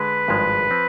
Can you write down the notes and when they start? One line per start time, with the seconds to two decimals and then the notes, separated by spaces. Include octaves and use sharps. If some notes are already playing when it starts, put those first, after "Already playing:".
Already playing: D3 G#3 B4
0.28 G#1 G2 F3 G#3
0.71 F3 C4